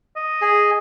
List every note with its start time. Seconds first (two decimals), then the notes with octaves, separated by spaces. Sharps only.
0.16 D#5
0.41 G#4